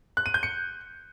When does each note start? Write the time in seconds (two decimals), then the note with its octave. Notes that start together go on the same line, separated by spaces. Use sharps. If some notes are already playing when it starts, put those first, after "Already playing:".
0.17 F#6
0.26 D#7
0.34 G6
0.43 C#7